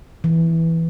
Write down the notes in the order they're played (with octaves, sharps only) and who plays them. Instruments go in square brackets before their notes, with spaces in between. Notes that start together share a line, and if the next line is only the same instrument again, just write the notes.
[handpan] E3